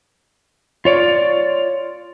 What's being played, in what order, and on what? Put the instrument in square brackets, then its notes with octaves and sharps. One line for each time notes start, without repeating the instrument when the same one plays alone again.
[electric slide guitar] F4 C#5 D5